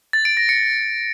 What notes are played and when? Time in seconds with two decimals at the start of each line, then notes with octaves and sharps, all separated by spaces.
0.13 A6
0.25 D7
0.37 A#6
0.49 C#7